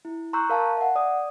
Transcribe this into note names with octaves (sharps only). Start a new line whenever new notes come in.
E4
A#5 C6 C#6 E6 F#6 G6
A#4 F5 A5
E5 F#5
D5 D#6